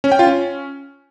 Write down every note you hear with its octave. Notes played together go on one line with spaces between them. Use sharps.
C#4
G5
F4
C#4